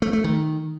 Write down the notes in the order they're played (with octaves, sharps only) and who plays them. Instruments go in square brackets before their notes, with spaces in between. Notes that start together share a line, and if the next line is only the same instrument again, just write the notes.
[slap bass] A3
A3
D#3